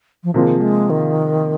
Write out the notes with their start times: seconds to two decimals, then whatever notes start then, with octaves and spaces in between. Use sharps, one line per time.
0.24 F3
0.34 C3 D#3 F3 A#3 F4 G#4
0.58 F#3
0.62 G#3
0.90 D#3